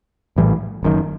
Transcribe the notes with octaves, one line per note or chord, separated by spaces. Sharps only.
A#1 A2 E3 G3
F#1 F#2 D#3